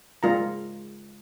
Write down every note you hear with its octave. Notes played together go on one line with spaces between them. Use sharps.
G#3 F4 A#4 A#5